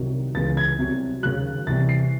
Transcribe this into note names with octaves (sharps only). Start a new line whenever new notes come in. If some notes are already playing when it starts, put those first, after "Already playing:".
Already playing: C2 C3 D#3 F#3
C#2 C#3 E3 A6
G#6
C2 C3 F#3
D#2 C#3 F#3 F#6
C2 C3 E3 A6
C7